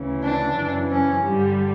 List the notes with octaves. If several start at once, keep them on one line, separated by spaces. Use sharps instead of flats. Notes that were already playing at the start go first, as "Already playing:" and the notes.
Already playing: D2 C#3 E3
D4
F#2 C#3 E3
C#4
G2 D3 G3